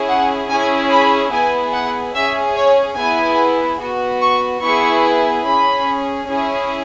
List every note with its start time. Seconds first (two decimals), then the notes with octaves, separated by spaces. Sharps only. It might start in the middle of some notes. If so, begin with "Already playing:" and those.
Already playing: C#4 E4 G#4
0.08 F#5
0.48 C#4 E4 G#4 G#5
0.91 B5
1.32 B3 E4 G#4 G#5
1.73 F#5
2.14 C#4 G#4 E5
2.56 C#5
2.97 B3 E4 G#4 G#5
3.80 B3 F#4
4.21 C#6
4.62 B3 E4 G#4 C#6
5.45 C#4 G#4 B5
6.28 C#4 E4 G#4